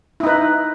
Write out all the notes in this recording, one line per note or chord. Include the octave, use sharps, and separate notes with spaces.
D#4 E4 B4